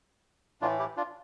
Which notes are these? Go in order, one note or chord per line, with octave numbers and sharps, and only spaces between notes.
A2 E3 A3 D4 F4
E4 G4
D4 F4